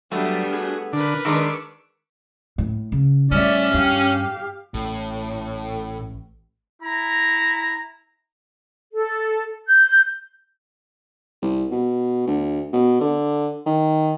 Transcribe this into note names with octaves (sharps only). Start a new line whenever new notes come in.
F#3 G3 A3 B3 D4
F#4 G#4
D3 D4 A#4 B4
D#3 G#3 D4 C#6 D6 E6
A2
C#3
A2 G3 C#4 D5 E5
G2 G4 F5
A1 A2
E4 A#5
A4
G6
C2
B2
D2
B2
D3
D#3